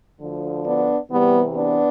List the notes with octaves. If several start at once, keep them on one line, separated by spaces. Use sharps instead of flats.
D2 D3 F3
B3 D4
E2 C3 E3 G3 B3
B3 D4